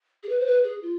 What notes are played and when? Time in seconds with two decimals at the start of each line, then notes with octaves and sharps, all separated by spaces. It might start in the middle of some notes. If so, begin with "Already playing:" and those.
0.23 G#4
0.29 B4
0.40 C5
0.46 B4
0.64 G#4
0.82 F4